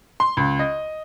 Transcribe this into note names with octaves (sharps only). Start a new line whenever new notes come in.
C6
C#2
D#5